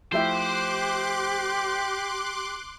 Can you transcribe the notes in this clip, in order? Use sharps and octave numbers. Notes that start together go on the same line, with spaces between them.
F3 A3 E4 G4 C5 C6 D6 F#6